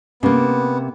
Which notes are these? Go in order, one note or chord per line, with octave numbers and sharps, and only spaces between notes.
C3 A#3 B3 C#4